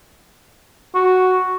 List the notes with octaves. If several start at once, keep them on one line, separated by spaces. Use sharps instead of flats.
F#4